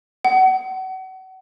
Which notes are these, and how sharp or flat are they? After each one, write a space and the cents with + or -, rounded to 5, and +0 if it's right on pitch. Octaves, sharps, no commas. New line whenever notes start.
F#5 +30